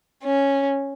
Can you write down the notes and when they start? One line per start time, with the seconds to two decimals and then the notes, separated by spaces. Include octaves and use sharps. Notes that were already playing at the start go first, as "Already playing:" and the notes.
0.24 C#4